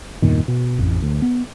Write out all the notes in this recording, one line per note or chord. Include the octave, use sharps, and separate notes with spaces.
E2 G2 A#2 D#3
B2
A1 F2 G#2
D2
B3